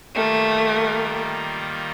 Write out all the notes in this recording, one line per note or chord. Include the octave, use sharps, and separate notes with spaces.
D#3 G3 A3 A#3 F4